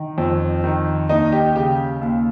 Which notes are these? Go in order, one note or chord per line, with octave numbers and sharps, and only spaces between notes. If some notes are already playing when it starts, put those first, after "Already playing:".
Already playing: D#3
F2
D#3
D#2 D#4
G4
C#3 G4
D#2